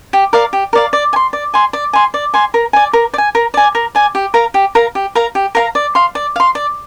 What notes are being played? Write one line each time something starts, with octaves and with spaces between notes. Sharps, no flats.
G4
A#4 D5 F5
G4
A#4 D5 F5
D5
G#5
C6
D5
G#5 C6
D5
G#5 C6
D5
G#5 C6
A#4
D5 G#5
A#4
D5
G#5
A#4
D5 G#5
A#4
D5 G#5
G4
A#4 F5 A#5
G4
A#4 F5 A#5
G4
A#4 F5 A#5
G4
A#4 F5 A#5
D5
F5 C6
D5
F5 C6
D5